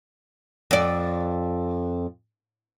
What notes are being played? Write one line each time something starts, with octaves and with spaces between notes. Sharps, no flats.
F2 D5